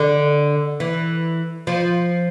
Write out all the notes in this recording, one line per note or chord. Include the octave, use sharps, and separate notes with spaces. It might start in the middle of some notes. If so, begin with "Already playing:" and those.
Already playing: D3
E3
F3